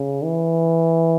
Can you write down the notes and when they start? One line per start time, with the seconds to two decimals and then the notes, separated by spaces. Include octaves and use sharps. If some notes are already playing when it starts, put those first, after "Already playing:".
Already playing: C#3
0.24 E3